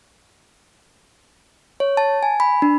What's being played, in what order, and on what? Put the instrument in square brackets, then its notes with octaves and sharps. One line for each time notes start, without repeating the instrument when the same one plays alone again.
[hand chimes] C#5
A5
G#5
B5
D4